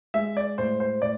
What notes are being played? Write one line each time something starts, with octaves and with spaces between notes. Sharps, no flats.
G#3 E5
D5
A2 C5
C5
A2 D5